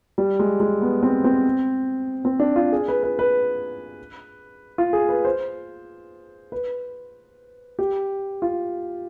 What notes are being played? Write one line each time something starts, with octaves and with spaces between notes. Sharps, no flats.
G3
G#3
G#3
B3
C4
C4
C4
D4
F4
G#4
B4
B4
B4
F4
G#4
B4
C5
B4
G4
F4